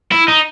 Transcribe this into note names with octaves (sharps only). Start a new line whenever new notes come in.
E4
D#4